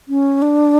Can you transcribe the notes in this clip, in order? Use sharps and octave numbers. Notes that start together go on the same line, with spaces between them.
C#4
D4